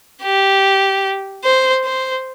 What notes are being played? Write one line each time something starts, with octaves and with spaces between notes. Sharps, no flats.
G4
C5
C5